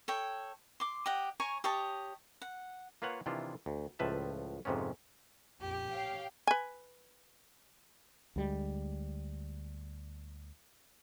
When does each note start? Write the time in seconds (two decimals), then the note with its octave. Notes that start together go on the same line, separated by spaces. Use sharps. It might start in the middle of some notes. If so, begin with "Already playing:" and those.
0.08 A4 C#5 G5
0.80 C6 D6
1.06 G4 D#5 F#5
1.40 C#5 G#5 A#5 C#6
1.64 G4 C#5 D#5 A5
2.42 F#5
3.02 A#3 F4 B4 C#5 F#5
3.26 C3 D#3 E3 D4 E4 F4
3.66 D2
3.99 C#2 A2 F3 B4 E5 A5
4.65 F2 G#2 C3 B3 C#4
5.61 A#1 F2 G4
5.90 C#5 F5 G5
6.47 B4 G#5
8.36 D2 G3 G#3